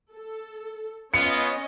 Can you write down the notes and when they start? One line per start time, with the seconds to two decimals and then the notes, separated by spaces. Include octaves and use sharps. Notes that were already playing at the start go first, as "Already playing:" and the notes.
0.11 A4
1.14 B3 C#4 F4 D#5 C#7